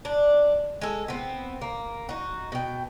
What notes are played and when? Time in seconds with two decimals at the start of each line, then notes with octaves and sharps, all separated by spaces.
0.05 D4
0.81 G#3 A4
1.08 B3 C4
1.61 A#3
2.09 D#4 F#4
2.52 B2 G5